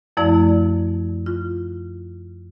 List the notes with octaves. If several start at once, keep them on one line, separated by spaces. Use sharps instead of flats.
F#2 F3 A3 E4 D5 A5
F4